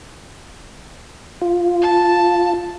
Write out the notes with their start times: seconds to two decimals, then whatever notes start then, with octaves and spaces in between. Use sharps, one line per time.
1.41 F4
1.82 A5